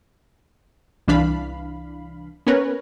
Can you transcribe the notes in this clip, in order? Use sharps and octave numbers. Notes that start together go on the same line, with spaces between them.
C2 E3 D4 F5 B5
B3 C#4 A#4 B4 C#5